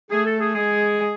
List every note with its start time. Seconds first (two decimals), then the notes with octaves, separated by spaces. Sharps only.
0.11 A3 G#4
0.26 A4
0.40 G#4
0.55 G#3 G#4